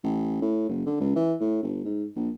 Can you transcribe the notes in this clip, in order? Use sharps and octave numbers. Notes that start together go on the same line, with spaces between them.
A1
A2
F#1
D3
C#2
E3
A2
G1
G#2
A#1